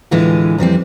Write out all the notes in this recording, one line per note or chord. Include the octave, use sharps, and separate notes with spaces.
D2 A2 D3 E3 G#3 F4
F2 E3 G3 C4